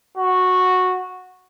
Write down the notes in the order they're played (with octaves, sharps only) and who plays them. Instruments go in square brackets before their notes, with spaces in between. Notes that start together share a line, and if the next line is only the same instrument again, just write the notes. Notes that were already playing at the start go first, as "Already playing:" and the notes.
[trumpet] F#4